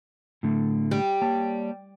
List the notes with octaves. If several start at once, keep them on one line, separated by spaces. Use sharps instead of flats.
A2 D3 A3
G3
A#3 C#5 A5